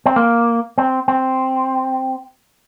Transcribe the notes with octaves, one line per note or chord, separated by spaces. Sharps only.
C4
A#3
C4
C4